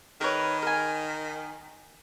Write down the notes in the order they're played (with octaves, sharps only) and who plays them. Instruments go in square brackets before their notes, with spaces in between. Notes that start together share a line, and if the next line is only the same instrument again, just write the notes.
[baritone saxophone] D#3 [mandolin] A#4 B4 C#5
[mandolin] A#4 G#5